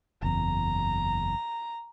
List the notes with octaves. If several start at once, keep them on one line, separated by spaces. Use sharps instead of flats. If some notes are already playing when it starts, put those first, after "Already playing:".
F#1 E2 A#5